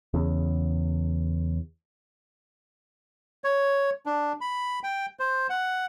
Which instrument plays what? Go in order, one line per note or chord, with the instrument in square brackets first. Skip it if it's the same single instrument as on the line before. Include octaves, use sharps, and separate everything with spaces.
[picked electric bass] E2 C#3
[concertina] C#5
D4
B5
G5
C5
F#5